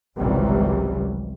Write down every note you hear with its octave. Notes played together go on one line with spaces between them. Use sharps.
G#1 C#2 C3 E3 F#3 G3